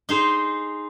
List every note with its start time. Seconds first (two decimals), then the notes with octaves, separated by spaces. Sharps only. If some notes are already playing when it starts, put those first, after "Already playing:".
0.09 D#4 G#4 C5